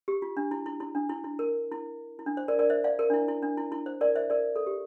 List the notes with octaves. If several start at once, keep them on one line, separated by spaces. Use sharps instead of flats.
G4
F4
D4
E4
E4
E4
D4
E4
E4
A#4
E4
E4
D4
C5
A#4 D5
A#4 D5
C5 E5
D5 F5
A#4
D4
E4
E4
D4
E4
E4
C5
A#4 D5
C5 E5
A#4 D5
A4
G4